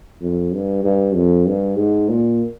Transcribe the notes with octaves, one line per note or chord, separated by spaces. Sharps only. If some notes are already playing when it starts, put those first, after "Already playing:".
F2
G2
G2
F2
G2
G#2
A#2